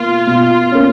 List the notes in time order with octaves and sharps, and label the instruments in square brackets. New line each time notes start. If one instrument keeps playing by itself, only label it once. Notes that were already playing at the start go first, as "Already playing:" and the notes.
Already playing: [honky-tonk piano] B2 A#3 [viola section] F4
[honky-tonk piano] B2
A#3 C#4